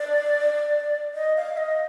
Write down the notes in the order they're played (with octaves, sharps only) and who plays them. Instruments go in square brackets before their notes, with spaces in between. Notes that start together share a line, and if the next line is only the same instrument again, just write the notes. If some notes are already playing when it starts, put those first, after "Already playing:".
Already playing: [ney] D5
D#5
F5
D#5